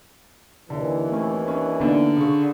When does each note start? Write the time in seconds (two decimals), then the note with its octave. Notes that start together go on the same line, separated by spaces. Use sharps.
0.70 D#2 D3 E3
1.12 A3 C4 C#4
1.48 C#4 D4
1.81 D3 A#3 B3 D#4
2.17 C#3 C#6